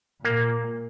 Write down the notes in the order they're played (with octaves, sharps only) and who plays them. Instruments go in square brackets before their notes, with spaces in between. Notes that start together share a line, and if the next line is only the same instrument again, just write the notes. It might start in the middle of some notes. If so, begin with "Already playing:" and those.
[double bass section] A#2 [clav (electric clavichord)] A#3 [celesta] A#4